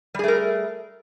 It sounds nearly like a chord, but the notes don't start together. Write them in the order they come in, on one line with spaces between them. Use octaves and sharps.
G3 G#4 A3 A#4